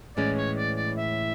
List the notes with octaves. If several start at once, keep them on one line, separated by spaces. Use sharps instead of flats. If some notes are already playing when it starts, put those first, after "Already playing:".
A2 E3 G#3 C#4 D5
C#5
D5
D5
E5